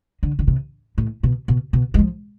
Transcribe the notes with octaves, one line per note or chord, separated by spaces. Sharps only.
D3
D3
C3
A2
B2
B2
B2
G#3
F3